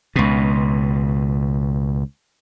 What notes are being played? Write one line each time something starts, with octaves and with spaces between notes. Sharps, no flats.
C#2 B2